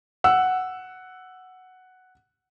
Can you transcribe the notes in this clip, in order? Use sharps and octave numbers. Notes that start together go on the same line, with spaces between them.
F#5 E6